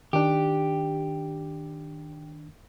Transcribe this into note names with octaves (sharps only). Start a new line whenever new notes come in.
D#3 D4 G4